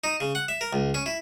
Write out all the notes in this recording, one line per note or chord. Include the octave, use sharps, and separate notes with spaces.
D#4
C#3
F#5
E5
A#4
C#2
C#4
E4